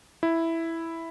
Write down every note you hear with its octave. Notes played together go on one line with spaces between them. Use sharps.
E4